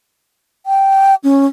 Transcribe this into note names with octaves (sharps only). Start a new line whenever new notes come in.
G5
C#4